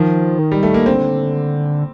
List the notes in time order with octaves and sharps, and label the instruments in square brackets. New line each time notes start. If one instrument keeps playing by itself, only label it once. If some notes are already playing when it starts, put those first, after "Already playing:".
Already playing: [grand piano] D#3 [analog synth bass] F3
[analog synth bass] D#3
[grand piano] G3
A3
A#3
[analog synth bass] D3 [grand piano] C4